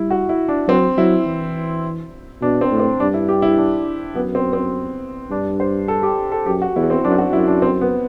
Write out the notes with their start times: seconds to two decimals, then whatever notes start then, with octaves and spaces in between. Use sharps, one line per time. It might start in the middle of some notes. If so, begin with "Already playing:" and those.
Already playing: G3 E4
0.10 F#4
0.29 E4
0.48 D4
0.68 F#3 C4
0.97 F#3 E4
1.26 E3
2.42 B2 D4
2.61 C4
2.71 A2
2.80 C4
3.00 G2 D4
3.14 E4
3.29 G4
3.42 E4
3.58 D4
4.15 F#2 B3
4.35 C4
4.53 C4
5.30 G2 D4
5.60 C5
5.88 A4
6.03 G4
6.32 A4
6.46 F#2 G4
6.62 F#4
6.76 E2 E4
6.90 C4
7.04 F#2 D4
7.18 F#4
7.33 F#2 E4
7.47 D4
7.62 C4
7.81 B3